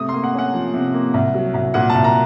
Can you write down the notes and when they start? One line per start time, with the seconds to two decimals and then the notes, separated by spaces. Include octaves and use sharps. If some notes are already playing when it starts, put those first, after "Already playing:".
Already playing: C3 A3 D#6
0.09 A#3 C6
0.23 F#5
0.34 C#4 F#5
0.54 F3
0.74 C3
0.94 A#3
1.14 C2
1.34 F#3
1.54 C2
1.74 A#2 F#5
1.90 C2 A5
2.04 A#5